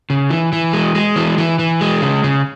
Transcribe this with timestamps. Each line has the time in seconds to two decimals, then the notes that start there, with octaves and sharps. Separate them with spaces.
0.10 C#3
0.30 E3
0.53 E3
0.73 G#3
0.95 G#3
1.16 E3
1.38 E3
1.59 E3
1.81 G#3
2.02 C#3
2.24 C#3